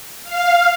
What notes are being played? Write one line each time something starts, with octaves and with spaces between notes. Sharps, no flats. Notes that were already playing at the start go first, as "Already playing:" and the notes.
F5